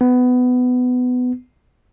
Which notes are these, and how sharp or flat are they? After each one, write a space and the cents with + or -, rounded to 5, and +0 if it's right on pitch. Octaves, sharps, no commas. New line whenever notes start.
B3 +20